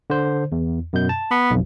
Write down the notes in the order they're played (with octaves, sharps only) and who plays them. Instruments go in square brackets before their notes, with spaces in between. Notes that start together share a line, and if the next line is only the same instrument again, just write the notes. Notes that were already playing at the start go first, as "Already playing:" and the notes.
[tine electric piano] D3 C5
E2
F#2 B2 G6
A5
[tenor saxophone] B3
[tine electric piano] B1 F2